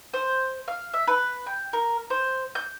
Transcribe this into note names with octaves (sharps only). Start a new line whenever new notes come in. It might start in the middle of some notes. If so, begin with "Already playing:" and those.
C5
F5
E5
B4
G5
A#4
C5
G6